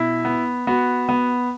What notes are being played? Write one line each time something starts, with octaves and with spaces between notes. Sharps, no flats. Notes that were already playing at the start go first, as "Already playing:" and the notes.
Already playing: B2 E4
B3
B3 F#4
B3